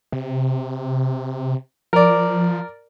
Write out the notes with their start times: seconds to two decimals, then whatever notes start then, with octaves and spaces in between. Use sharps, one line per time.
0.12 C3
1.93 F3 A#4 D5